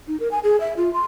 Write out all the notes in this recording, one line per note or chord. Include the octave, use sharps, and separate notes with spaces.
D#4
A#4
G#5
G#4
E5
F4
C6